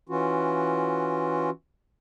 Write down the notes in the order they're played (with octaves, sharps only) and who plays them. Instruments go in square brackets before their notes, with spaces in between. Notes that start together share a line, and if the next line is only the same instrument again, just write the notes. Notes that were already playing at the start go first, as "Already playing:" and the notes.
[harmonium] E3 C#4 F4 F#4